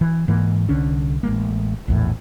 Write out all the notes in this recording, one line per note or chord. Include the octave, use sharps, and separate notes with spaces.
E3
G#2 E3 A#3
C2 D3 C#4 D4
A1 G#3 A#3
A#1 E2 A2